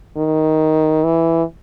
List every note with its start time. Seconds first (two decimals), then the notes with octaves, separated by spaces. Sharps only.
0.17 D#3
1.04 E3